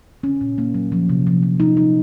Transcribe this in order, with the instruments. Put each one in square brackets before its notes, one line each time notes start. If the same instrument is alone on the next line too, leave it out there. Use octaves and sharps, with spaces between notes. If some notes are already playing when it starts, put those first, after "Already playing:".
[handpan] C#4
A#2
A#3
F#3
F3
C3
F3
F3
D#4
D#4